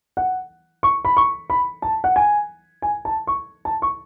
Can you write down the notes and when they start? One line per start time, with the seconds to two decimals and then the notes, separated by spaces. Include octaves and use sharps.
0.17 F#5
0.83 C#6
1.05 B5
1.17 C#6
1.50 B5
1.82 A5
2.04 F#5
2.16 G#5
2.82 G#5
3.05 A5
3.27 C#6
3.65 A5
3.82 C#6